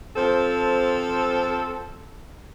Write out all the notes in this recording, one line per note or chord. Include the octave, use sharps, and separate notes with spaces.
F3 C4 A4